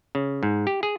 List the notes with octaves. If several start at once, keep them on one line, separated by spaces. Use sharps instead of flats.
C#3
G#2
G4
G#4